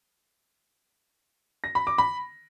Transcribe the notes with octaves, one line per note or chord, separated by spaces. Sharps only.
A#6
B5
D6
B5